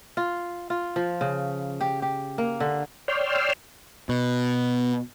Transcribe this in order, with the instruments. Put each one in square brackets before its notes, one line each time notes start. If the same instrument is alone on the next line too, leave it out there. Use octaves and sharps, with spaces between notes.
[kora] F4
F4
F3
C#3
G4
G4
A#3
D3
[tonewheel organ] C#5 D5 G5 C6 E6 F6
[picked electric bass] B2